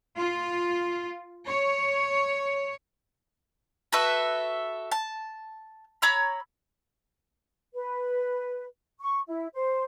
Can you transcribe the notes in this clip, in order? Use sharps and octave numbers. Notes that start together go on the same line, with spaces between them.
F4
C#5
F#4 A4 B4 E5
A5
C#5 A#5 B5 E6
B4
C#6
E4
C5